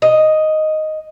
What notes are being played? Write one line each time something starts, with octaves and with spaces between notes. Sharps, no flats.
D#5